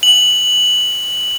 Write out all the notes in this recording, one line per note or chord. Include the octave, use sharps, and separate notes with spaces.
F#7